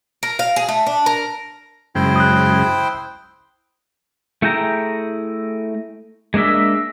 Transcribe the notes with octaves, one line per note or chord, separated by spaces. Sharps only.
A#4
F5
G#4
A3
D4
A#4
F#2 C#3 G#3 E4 C5 G5
D#6 F#6
A3 E4 G#4 G5 A#5
G#3 A#3 D4 D#5 E5